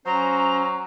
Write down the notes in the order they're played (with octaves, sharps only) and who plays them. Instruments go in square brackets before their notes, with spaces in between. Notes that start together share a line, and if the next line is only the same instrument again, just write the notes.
[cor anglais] F#3 [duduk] C#4 [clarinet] C5 [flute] A#5